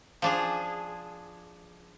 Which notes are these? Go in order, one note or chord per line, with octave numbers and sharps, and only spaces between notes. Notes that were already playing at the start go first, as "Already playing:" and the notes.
F3 D4 G#4